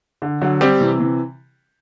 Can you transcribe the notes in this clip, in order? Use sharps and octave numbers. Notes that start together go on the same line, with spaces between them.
D3
D3 F#3
G3 C4 G4
C3 E3
C3 E3